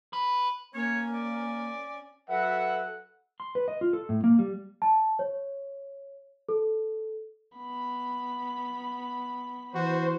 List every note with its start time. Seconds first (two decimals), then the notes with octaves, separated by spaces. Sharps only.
0.13 B4
0.74 A#3 C#4 C#5 G#5
1.12 D5
2.29 F#3 A4 B4 E5 F#5
3.40 C6
3.55 B4
3.68 D#5
3.81 F4
3.93 A4
4.09 A2
4.24 A#3
4.39 G3
4.82 A5
5.19 C#5
6.49 A4
7.57 B3 B5
9.75 E3 F#4 C5